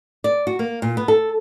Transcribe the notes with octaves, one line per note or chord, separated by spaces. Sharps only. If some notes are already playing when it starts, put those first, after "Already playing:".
D5
F#4
A#3
A#2
B3
A4